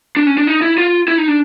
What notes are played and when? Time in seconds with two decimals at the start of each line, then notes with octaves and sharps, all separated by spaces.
0.16 D4
0.27 C#4
0.38 D4
0.47 D#4
0.62 E4
0.78 F4
1.08 E4
1.18 D#4
1.28 D4